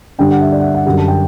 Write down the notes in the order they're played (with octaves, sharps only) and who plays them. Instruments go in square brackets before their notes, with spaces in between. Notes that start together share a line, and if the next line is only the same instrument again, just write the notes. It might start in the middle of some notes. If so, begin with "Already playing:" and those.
[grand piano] G2 D3 G3 D4 G5
F#5
E5
D5
F#5
E5
F#5
F#2 D3 G3 F#5
A5
G5